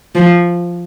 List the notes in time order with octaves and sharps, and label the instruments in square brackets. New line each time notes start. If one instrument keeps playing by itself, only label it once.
[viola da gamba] F3